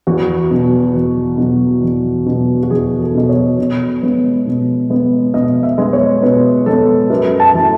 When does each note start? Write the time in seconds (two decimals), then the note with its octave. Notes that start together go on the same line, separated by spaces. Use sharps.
0.07 E2 F#4
0.50 B2 F#3
0.95 E2
1.38 B2 F#3
1.83 E2
2.26 B2 F#3
2.63 F#4
2.70 E2 G#4
3.00 A4
3.15 B2 F#3 D#5
3.29 C#5
3.59 B2
4.03 G#3 B3
4.47 B2
4.90 G#3 B3
5.34 B2 D#5
5.63 E5
5.78 G#3 B3
5.93 C#5
6.22 B2 B4
6.66 G#3 B3 A4
7.10 F#2 B4
7.40 A5
7.54 E3 A3